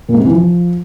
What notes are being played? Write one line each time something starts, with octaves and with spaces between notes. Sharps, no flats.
A#2
G#2
C3
E3
F3